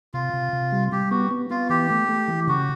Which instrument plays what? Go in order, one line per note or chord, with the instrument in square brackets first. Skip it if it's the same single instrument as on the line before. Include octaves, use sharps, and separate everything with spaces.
[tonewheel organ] C3 [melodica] F4
[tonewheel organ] C3
C3
G3
[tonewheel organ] G3 [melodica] G4
[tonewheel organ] B3 [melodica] F#4
[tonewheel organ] B3
[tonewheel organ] B3 [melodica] F4
[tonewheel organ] E3 [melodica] G4
[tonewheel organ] A3
A3
E3
[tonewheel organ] C#3 [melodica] F#4